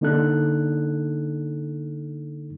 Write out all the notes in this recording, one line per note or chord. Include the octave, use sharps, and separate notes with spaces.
D3 A#3 D4 D#4 A4 F#6